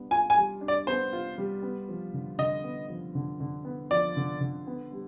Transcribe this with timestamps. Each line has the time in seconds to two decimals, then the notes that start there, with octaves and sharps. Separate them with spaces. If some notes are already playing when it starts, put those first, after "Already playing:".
Already playing: G3 B3 D4
0.11 F4 G#5
0.30 G#5
0.37 G3
0.61 D4
0.68 D5
0.87 B3 C5
1.13 F4
1.38 G3
1.62 B3
1.89 F3
2.14 D3
2.38 D3 D#5
2.64 B3
2.89 F3
3.15 D3
3.40 D3
3.65 B3
3.91 F3 D5
4.16 D3
4.41 D3
4.67 B3
4.92 G3